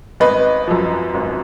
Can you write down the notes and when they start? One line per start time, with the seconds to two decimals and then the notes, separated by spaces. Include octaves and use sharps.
0.20 G#1 B4 D#5
0.67 F#2 F3
1.14 G#1